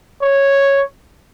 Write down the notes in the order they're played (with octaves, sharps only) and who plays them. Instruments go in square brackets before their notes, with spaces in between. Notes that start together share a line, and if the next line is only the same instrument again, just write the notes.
[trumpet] C#5